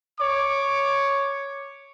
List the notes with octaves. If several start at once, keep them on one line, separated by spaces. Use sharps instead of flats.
C#5 D6